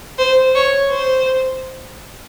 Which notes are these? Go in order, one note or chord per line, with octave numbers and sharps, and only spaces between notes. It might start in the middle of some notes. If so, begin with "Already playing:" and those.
C5
C#5
C5